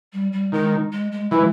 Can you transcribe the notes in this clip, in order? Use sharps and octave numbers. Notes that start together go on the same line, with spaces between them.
G3
G3
D#3 G#3
G#3
G#3
E3 G#3